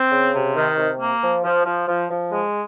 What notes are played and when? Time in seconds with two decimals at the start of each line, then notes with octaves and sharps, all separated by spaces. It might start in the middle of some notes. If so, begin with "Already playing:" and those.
Already playing: C4
0.11 C#3
0.34 C3
0.56 D#3
0.77 C3
1.00 A#3
1.22 F3
1.44 F3
1.65 F3
1.88 F3
2.10 F3
2.32 G#3